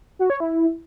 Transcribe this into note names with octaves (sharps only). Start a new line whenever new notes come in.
F#4
C#5
E4